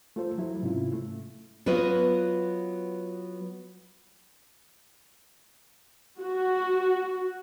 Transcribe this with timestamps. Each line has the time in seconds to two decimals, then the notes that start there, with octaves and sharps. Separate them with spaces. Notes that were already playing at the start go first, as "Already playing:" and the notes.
0.16 A3 F4 A4 C5
0.38 F#3 E4
0.63 G#2 C3 C#4 E4 F4
0.93 A3
1.66 F#3 B3 F4 B4 D#5
6.20 F#4